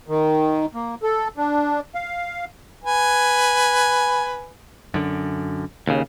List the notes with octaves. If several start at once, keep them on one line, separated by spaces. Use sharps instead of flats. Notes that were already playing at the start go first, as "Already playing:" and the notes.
D#3
A#3
A4
D4
F5
B4 G#5
F#2 D3
D#2 C#3